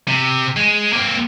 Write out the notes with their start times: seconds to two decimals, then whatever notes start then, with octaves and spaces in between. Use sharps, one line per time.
0.08 C3
0.57 G#3
0.93 A#3 C4